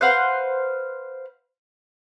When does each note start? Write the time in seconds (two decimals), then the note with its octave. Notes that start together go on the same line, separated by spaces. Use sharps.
0.01 B4 C5 F5 F#5